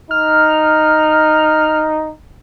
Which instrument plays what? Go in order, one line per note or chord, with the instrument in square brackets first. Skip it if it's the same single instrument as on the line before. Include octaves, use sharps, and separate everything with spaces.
[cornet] D#4 [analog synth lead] F6